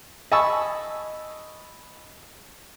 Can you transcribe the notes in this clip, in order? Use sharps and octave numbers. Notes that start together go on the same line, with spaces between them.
D#5 G#5 A5 B5 C#6 E6